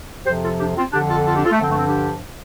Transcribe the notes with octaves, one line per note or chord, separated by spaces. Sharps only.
F2 C3 F3 G4 C5
F4 A4
D4 G4
C4 F4
F2 D3 F3 D4 G4
F4 A4
F4 A4
D4 G4
F4 A4
A3
G2 D3 F3 C4
A3
C4
D4 G4